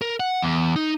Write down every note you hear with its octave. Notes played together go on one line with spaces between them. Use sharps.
A#4
F#5
E2
D#4